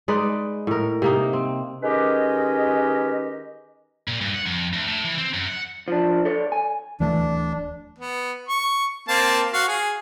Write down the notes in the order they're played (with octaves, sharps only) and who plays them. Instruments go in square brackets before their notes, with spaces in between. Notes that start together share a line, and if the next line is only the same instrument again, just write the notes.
[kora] G#3 D#4 B4 D5
A2 A#4
C3 A#3 D#4
C4
[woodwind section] D#3 G#3 C#4 G4 B4 D#5
[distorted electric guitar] A#2
G2
F#5
F2
D2
A2
E3
C4
F#2
F#5
[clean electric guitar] F3 D4
A4 C#5 D5
G#5
[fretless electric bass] D1 E3 A3 [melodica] D4
[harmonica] B3
C#6
A#3 C4 A5
F#4 F5
G#4